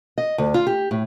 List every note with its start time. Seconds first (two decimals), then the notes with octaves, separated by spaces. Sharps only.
0.18 D#5
0.38 D2
0.54 F4
0.67 G4
0.91 A2